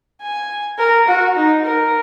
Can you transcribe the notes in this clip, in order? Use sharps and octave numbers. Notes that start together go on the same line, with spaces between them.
G#5
A#4
F#4
D#4
A#4